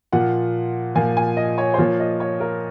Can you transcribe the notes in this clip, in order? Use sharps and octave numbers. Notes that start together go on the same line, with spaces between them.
A#2 F3 A#3 F#5
A#2 F3 A#3 G#5
G#5
D#5
C#5
C5
A#2 F3 A#3 C#5
D#5
C#5
A#4